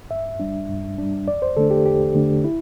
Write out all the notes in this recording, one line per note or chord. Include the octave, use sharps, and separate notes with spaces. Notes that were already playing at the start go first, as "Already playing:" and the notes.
G2 E5
G3 D4
G2
G3 D4
E2 D5
C5
D3 A3 D4 A4
G4
E2 G4
D3 A3 D4
E4